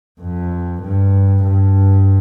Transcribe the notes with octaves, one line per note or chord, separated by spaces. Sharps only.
F2
G2
G2